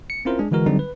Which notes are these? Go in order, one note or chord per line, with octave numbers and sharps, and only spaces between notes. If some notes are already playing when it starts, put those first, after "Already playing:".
C#7
C4 C#4 E4 F4 A#4 C5
G#3 D4 G#4
D3 E3 G#3 F#4 A#4
D3 F#3 G3 C4 D#4
B4